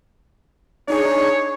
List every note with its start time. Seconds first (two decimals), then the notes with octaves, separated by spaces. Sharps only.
0.88 D4 D#4 G#4 C#5